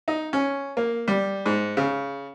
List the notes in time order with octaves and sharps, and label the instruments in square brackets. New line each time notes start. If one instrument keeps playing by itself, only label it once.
[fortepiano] D#4
C#4
A#3
G3
G#2
C#3